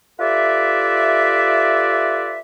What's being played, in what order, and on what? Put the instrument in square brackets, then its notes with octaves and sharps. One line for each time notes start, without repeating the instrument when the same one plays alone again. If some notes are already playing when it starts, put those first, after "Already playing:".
[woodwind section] F4 G4 A4 B4 D5 E5